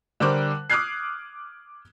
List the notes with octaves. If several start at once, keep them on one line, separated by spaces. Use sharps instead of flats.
D3 G3 A#4 C5 D6 F#6
D6 D#6 F6 F#6 G#6 C7